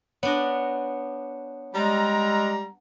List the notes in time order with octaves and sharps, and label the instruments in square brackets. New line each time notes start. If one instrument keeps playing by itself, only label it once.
[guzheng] B3 D4 D#5 [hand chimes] C#5
[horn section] G3 A#5 [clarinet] G#3